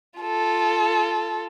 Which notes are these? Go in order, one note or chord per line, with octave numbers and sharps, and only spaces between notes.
F4 A4